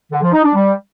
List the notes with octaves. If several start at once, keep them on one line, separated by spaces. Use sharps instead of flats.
D3
F3
D#4
D4
G3